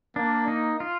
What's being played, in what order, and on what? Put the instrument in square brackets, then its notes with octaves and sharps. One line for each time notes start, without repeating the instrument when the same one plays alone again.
[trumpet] A#3 [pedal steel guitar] D4
[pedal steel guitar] D#4
F4